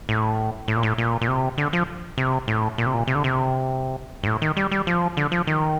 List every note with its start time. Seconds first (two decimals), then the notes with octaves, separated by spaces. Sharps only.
0.09 A2
0.68 A2
0.76 A#2
0.83 A2
0.98 A#2
1.21 A#2
1.28 C3
1.58 D3
1.73 F3
2.18 C3
2.48 A2
2.78 A#2
2.86 C3
2.94 A#2
3.07 C3
3.15 D3
3.24 C3
4.23 G2
4.27 A2
4.42 D#3
4.57 G3
4.72 G3
4.87 F3
5.17 D3
5.32 F3
5.47 D#3